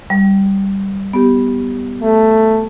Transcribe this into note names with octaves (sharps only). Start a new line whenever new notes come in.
G3
B3 G4
A3